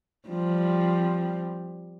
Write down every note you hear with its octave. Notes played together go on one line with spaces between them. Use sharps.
F3 G3 C4